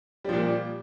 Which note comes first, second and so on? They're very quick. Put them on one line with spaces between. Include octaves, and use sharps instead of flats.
G3 F3 A#2